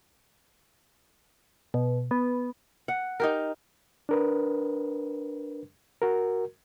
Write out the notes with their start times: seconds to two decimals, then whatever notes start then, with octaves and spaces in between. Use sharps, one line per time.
1.74 B2
2.11 B3
2.88 F#5
3.20 D#4 G4 A#4
4.09 D4 A#4 B4
6.02 F#4 A#4